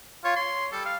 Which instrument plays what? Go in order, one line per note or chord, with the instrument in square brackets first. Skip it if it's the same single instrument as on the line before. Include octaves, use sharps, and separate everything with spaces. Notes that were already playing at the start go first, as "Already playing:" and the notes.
[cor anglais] F4 [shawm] C#5
[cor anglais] C#5 [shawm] C6
[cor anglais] G3 [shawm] A4
[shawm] F5